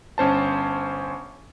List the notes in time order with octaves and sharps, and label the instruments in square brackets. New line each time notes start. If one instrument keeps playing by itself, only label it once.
[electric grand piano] G1 C#4 C5 A5